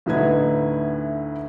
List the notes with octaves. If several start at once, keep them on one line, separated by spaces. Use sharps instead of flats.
D2 A2 D3 D#4 B4 G#6